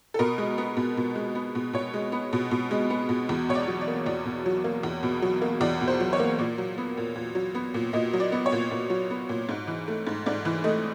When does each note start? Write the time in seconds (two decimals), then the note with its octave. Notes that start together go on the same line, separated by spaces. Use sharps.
0.14 A4
0.19 B2 A#4
0.38 G#3
0.58 B3
0.77 B2
0.97 B2
1.15 G#3
1.35 B3
1.55 B2
1.73 B2 C#5
1.94 G#3
2.12 B3
2.33 B2
2.51 B2
2.71 G#3
2.90 B3
3.09 B2
3.29 E2
3.49 B2 C#5
3.55 D5
3.68 F#3
3.81 D5
3.88 A#3
4.06 E2 D5
4.26 B2
4.46 F#3
4.64 A#3
4.83 E2
5.03 B2
5.22 F#3
5.42 A#3
5.61 E2 D5
5.81 B2
5.88 C5
6.00 F#3
6.13 C#5
6.20 A#3
6.39 A#2 D5
6.58 F#3
6.78 B3
6.97 A#2
7.16 A#2
7.35 F#3
7.55 B3
7.74 A#2
7.93 A#2 D#5
8.13 F#3
8.20 D5
8.32 B3
8.46 C#5
8.52 A#2
8.71 A#2
8.90 F#3
9.10 B3
9.29 A#2
9.49 G#2
9.67 E3
9.88 A3
10.07 G#2
10.26 G#2 D5
10.45 E3
10.64 A3 D#5